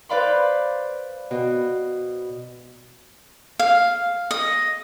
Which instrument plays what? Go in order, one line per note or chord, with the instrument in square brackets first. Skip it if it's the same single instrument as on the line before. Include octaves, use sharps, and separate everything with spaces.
[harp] B4 C5 D5 F5 B5 C6
B2
[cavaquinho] F5
D#5